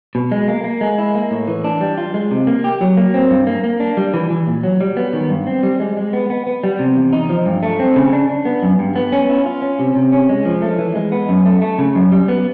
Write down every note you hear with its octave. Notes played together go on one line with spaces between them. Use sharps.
B2
G#3
A#3
A#3
G#3
E4
A#3
A2
E3
D4
G3
F4
G#3
C3
A#3
G4
F#3
A#3
C4
G2
A#3
A#3
D4
G3
E3
E3
A#2
F#3
G3
B3
D#3
G2
C4
G3
G#3
G#3
B3
B3
B3
G3
C3
E2
D#4
F3
G2
A3
C4
C#3
D4
D4
B3
F#2
G2
B3
C#4
E4
F4
C#4
C3
C3
C#4
G#3
F3
A3
E3
G#3
B3
F#2
A3
A3
C#3
F#2
G3
B3